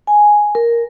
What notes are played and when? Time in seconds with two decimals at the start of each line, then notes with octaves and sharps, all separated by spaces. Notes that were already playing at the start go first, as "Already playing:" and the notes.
0.07 G#5
0.55 A#4